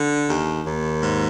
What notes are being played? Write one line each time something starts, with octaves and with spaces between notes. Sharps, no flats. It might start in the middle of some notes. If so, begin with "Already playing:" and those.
Already playing: D3
D#2
D#2
G#2